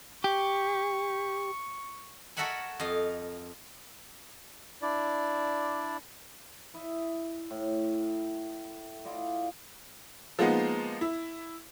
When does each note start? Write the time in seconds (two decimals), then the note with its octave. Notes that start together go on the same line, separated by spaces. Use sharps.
0.24 G4 C#6
2.37 F#4 A4 A#4 E5 F#5 G#5
2.80 F2 D#5 F5
4.82 D4 E4 D5
6.74 E4 D#5 E5
7.50 A2
9.05 E4 F4 D5 D#5
10.39 F3 G#3 A#3 B3 D#4
11.01 E4